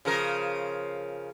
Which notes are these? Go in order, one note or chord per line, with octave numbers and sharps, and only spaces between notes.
C#3 F3 A#4